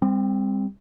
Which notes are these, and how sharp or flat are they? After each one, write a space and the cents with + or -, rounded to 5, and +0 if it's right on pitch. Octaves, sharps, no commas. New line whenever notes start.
G3 +35 C4 +0